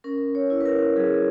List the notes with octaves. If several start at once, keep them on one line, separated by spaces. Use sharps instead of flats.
C#4 A#4
C#5
E4
B4
A#4
F#3 G#4